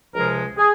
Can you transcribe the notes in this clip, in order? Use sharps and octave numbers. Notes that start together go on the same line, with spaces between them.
C#2 C3 F3 G#3 A#4
G#4